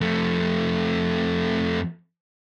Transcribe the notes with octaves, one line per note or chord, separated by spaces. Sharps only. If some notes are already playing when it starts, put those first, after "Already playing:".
F2 A3